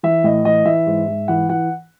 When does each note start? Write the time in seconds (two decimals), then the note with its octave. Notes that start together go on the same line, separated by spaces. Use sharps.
0.03 E3 E5
0.24 A2 D#5
0.45 E3 D#5
0.65 E3 E5
0.87 G#2
1.08 G#2
1.28 E3 F#5
1.49 E3 F#5